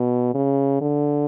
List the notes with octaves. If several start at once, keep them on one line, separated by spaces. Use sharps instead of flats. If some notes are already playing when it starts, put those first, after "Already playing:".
Already playing: B2
C#3
D3